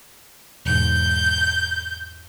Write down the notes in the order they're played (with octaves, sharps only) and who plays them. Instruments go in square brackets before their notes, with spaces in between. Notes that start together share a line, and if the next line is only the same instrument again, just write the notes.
[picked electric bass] E1 G#2 [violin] G6